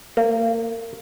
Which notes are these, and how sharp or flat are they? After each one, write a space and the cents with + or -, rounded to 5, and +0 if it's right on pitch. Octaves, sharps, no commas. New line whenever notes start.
A#3 -30